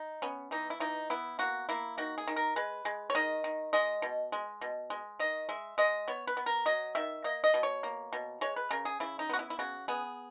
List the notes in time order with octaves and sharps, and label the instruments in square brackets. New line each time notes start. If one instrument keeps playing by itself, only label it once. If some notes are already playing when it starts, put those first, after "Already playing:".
Already playing: [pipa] D#4
B3 C#4
E3 D#4
E4
E3 D#4
B3 E4
A#3 F#4
A#3 E4
D#3 F#4
G#4
D#3
A#4
G#3 B4
G#3
C#5
D#3 D#5
D#3
G#3 D#5
B2
G#3
B2
G#3
D#3 D#5
G#3 E5
G#3 D#5
B3 C#5
B4
B3
A#4
F#3 D#5
D#3 E5
A#3 D#5
D#5
B2
C#5
A#3
B2
G#3 C#5
B4
C#3 A#4
G#4
C#3 E4
D#4
B3 F#4
E4
E4
C#3 F#4
B3 G#4